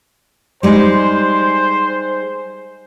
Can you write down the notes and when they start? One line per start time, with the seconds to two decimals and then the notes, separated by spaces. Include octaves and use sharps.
0.63 G3 G#3 D#4 C5